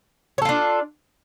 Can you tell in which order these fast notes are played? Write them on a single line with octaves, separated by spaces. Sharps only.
C#5 A4 F4 D4